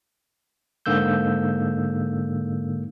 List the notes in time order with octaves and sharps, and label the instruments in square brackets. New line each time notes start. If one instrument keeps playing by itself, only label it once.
[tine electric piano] G#2 D3 A#3 E6 G6